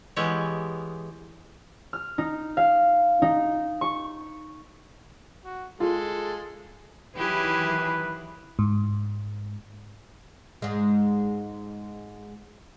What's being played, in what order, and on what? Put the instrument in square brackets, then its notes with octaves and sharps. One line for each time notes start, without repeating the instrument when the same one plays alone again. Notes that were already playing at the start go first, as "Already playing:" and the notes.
[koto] E3 G#3 B3 G4 C#5
[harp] F6
D#4
F5
D#4
C#6
[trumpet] F#4
[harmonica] G#3 [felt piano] F4 [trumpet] A4
[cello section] D#3 E3 F#3 [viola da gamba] E4 G4 G#4 [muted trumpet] B4
[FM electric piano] G#2
[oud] G#2 G#3